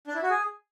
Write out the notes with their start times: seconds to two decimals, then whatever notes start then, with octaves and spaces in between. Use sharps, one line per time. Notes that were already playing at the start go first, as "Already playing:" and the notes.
0.07 D4
0.15 E4
0.23 F#4
0.30 G#4